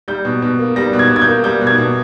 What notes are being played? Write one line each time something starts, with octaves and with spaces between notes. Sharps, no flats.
G3 G6
B2
B2
A#3
G3 A#6
B2
G#6
B2
G#6
G6
A#3
G3 G6
B2
G#6
B2